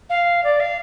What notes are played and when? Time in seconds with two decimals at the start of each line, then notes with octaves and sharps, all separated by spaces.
0.09 F5
0.43 D5
0.60 F5